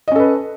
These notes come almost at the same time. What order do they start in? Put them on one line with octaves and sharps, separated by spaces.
D#5 C#4 A4 B4